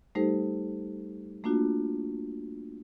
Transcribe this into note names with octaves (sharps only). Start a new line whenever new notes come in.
G3 A3 D#4 G4 A4 C5
A3 A#3 D4 F4 F#4